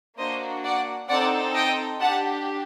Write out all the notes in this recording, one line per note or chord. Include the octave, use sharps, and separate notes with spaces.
A#3 D4 F#4 C5 D#5
D5 F#5
C4 D#4 A4 D5 F#5
D#5 G5
D4 G4 F#5 A5